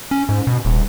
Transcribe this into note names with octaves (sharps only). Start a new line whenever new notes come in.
C#4
G#2
B2
D#1